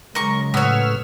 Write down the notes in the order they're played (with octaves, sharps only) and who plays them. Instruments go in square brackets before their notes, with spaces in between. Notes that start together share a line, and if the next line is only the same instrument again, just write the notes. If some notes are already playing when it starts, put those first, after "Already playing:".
[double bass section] C#3 F#3 G#3 [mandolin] A#4 C#6
[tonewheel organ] A2 E6 F6 [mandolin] B3 C#5